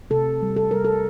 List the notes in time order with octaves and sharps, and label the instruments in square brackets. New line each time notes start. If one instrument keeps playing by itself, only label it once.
[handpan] C3 A4
G3
A4
G3 A#4
A4